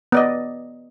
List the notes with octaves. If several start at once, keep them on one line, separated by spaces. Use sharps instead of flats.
B3 D5 D#5